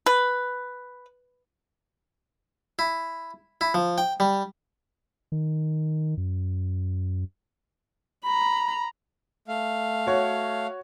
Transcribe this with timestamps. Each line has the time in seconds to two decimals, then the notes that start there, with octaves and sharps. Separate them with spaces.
0.06 B4
2.79 E4
3.61 E4
3.74 F3
3.98 G5
4.20 G3
5.32 D#3
6.17 F#2
8.24 A#5 B5
9.48 A3 F5
10.07 F#4 C#5